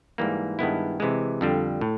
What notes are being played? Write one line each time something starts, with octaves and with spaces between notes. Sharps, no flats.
G#2 E3 G3 A#3
G2 D#3 G#3 B3 E4
C3 E3 G#3
F2 D3 G3
A2